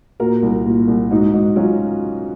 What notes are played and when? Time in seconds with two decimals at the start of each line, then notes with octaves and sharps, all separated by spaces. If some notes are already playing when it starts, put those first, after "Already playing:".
0.20 A#2 F#4 A#4
0.43 C2
0.66 A#2
0.88 C2
1.11 G#2 D#4 F#4
1.34 G#2 D#4 F#4
1.56 F#3 C#4 F4